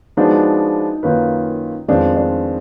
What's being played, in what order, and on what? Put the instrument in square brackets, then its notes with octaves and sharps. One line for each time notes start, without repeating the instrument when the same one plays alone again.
[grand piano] F3 G#3 B3 D4 F#4 [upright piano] D#4
[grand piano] F#2 D#3 A#3 F4 B4
[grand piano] F2 D#3 G#3 B3 F4 [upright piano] D4
[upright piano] D4